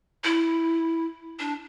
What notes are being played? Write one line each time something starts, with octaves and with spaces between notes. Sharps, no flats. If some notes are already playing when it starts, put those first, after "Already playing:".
E4
D4